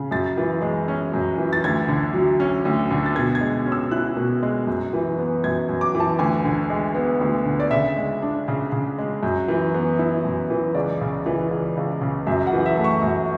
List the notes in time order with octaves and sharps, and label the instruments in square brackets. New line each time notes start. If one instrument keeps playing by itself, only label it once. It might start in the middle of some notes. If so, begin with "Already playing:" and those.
Already playing: [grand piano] C#3
F#2 A6
E3
G#3
C#4
F#2
E3
A6
D2 G#6
D3
F#3
C#4
D2
D3
A6
B2 G#6
G#6
G#3
C#4
E6
E4 F#6
B2
G#3
F#2
E3
B3
F#2 G#6
F#2
D6
E3
A5
D2 G#5
D3
G#3
B3
D2
D3
D5
C#3 E5
G#3
D4
C#3
C#3
G#3
F#2
E3
B3
E4
F#2
E3
C#2 D5
C#3
E3
C#2
C#2
C#3
F#2 E5
F#5
E3
E5
A3
C#6
F#2